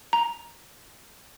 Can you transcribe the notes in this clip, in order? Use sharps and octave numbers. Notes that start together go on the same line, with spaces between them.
A#5